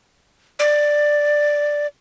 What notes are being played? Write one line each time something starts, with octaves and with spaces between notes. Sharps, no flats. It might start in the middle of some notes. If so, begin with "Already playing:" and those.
D5